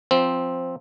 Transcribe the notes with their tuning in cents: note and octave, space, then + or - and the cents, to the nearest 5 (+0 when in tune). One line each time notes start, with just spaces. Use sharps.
F3 +5 C4 +0